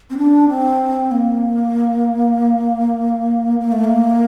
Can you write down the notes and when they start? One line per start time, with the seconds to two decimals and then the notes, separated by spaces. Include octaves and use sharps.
0.10 C4
0.18 D4
0.49 C4
1.11 A#3
3.60 A#3
3.72 A3
3.84 A#3